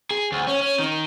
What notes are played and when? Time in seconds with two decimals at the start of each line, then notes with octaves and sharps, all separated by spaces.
0.11 G#4
0.32 D2
0.47 C#4
0.61 C#4
0.79 D#3